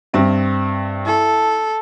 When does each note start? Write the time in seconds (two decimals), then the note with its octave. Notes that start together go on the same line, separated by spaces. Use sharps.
0.13 G2 C4 E5
1.06 E4 A4